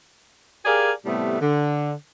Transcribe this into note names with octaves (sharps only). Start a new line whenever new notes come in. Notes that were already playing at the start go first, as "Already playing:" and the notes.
G4 G#4 A#4 D5 F5 G#5
A2 C3 G3 A3 B3
D3